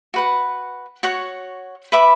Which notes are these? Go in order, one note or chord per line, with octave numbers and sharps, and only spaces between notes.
F#4 B4 F#5
F#4 C#5 F#5
B4 E5 B5 D6